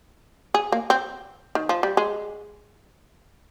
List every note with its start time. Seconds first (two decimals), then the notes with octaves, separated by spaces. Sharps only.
0.54 G#4
0.72 A#3
0.90 C4
1.55 D#3
1.69 F3
1.83 G3
1.97 G#3